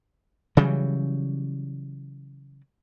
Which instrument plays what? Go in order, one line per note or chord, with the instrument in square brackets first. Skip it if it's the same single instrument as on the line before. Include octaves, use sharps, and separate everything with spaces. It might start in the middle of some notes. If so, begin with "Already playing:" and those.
[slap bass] C#3 E3 F#3 G3